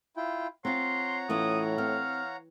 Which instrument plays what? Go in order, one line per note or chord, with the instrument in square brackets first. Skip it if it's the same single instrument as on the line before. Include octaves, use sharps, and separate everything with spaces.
[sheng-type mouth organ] E4 F4 G5
[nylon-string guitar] C4 F4 [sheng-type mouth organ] C#5 F#5 A#5 [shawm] C6
[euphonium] A2 [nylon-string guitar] E3 C#4 F4 [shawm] D#6
[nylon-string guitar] C4 [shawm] F5